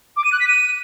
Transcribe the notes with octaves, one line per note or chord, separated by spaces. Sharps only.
D6
D#7
F#6
B6
D#7